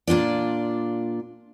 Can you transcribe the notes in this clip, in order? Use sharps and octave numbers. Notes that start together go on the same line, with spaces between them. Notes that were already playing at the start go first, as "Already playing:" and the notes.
A#2 D4 F4 D5